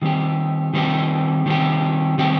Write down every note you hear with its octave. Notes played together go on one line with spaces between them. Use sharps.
D#3 G3 C4 G4
D#3 G3 C4 G4
D#3 G3 C4 G4
D#3 G3 C4 G4